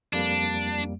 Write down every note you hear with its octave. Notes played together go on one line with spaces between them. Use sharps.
F2 G3 A#3 D4